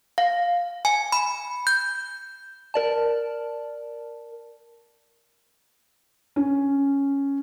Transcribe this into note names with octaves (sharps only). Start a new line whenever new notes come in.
F5
G#5
B5
G6
A#4 D5 A5
C#4